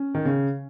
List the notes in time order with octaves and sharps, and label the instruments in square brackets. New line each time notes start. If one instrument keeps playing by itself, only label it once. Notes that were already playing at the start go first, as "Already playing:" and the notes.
Already playing: [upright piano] C#4
[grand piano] D#3
C#3